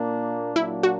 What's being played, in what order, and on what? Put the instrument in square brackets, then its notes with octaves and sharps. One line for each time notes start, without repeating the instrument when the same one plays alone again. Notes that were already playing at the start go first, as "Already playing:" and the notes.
Already playing: [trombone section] A#2 A#3 D4
[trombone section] A#2 F#3 A#3 D4 [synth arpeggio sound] E4
[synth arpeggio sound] F#4